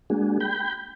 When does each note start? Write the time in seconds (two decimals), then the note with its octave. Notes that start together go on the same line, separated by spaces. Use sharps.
0.10 G#3 A#3 D4 F#4 G#4
0.40 G5 B5 G6